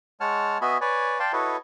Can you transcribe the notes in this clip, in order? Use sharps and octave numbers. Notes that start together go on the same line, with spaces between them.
G#3 C#5 F#5 A5 F6
B3 F#4 D#5 E5 G#5 B5
B4 C#5 D5 G#5
D5 F5 G5 A5 C6
E4 F#4 A4 B4 C#5 D#5